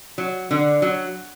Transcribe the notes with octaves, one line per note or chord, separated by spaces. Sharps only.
F#3
D3
F#3